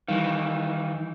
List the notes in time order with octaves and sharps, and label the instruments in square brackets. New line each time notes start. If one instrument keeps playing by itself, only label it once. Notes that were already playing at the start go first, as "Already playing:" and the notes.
[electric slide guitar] D#3 E3 [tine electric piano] G3 F5